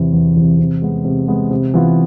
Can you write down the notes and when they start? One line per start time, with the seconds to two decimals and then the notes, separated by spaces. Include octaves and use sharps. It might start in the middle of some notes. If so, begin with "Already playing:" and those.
Already playing: E2 C3 E3
0.13 E2
0.36 C3 E3
0.59 C3
0.82 G#3 B3
1.05 C3
1.28 G#3 B3
1.51 C3
1.74 E3 B3 F4